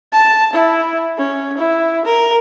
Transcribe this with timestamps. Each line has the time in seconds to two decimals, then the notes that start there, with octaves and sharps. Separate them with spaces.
0.12 A5
0.53 E4
1.18 C#4
1.57 E4
2.05 A#4